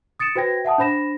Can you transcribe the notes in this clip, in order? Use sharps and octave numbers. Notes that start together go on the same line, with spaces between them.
D#6 A6 C#7 D7 E7
F#4 B4 C5 G5 G#6 A#6
E5 F#5 A5 D#6
D4 C5 B5 A#6 E7